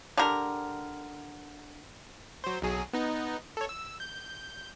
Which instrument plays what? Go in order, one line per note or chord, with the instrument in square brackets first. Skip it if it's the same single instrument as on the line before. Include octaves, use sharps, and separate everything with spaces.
[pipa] D3 G4 A#4
[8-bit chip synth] F#3 C5
B1 F#3 G#4
B3 D#4
A4 C#5
E6
G6